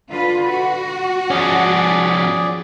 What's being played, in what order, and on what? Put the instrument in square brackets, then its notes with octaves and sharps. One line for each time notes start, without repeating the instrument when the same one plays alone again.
[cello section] D3 F4 B4
F#4
[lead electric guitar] F3 C#4 [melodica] G#4 D5